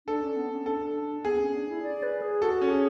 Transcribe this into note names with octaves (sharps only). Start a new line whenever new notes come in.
D4 A4
C#4
B3
C#4
D4 A4
B3 G#4
C#4
D4
E4
D5
B4
G#4
F#4 A4
C#4
G#4